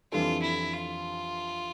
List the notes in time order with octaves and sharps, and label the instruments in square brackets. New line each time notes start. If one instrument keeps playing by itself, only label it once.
[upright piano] F2 E3 G3 D4 A4 [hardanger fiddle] F4
[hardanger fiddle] E4
F4